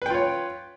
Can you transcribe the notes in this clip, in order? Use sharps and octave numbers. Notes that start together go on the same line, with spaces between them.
F4 B4 C#5 G5